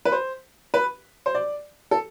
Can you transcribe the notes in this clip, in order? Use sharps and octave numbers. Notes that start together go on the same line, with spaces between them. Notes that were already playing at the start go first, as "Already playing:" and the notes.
B4
C5
B4
C5
D5
A4